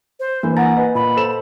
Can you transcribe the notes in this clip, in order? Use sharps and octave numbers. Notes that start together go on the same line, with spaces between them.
C5
E3 A#3 D4 A#4
F#5 G#5 A#5 A6
B4 D#5
A#2 B5
A4 C5 E7